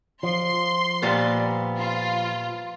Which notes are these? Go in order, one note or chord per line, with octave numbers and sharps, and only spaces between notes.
F3 C6
A#2 G3 B3
F4